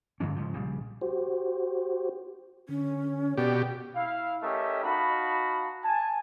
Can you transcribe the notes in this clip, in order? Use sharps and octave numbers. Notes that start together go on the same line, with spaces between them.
G2 D3 E3 C#4
G#2 C#3 F3
A#1 C#3 G3
F#4 G4 C5
D3 C#4
B2 G4 D5
E4 F5
A3 C#4 G4 A#4 D#5 E5
D#4 F#4 F5 A5 B5
G#5 A5